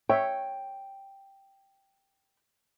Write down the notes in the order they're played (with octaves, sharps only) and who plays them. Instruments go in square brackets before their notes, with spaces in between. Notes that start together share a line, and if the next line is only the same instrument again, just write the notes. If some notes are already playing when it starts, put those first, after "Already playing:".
[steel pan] C#5 E5 [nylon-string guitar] G5